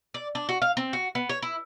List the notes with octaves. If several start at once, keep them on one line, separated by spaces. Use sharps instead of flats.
D5
D4
F#4
F5
C4
F#4
B3
C#5
E4